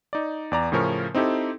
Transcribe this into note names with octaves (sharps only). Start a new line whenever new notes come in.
D#4 D5
E2 D5 A#5
A2 C#3 F3 C#4 A#4 C#6
C4 D#4 E4 G4 A4